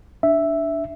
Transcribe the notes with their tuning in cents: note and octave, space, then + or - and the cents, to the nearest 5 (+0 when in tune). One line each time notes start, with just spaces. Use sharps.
D4 +0 E5 +0